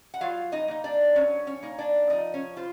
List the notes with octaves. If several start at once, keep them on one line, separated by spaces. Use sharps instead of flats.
F#5
F#3 F4 F5
D#4 D#5
A#3 D#4
D4 D5
F#3 C#4 C#5
C#4 C#5
A#3 D#4
D4 D5
F3 D#4 D#5
C#4 C#5
F4 C5